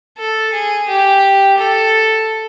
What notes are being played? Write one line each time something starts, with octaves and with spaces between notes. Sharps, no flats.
A4
G#4
G4
A4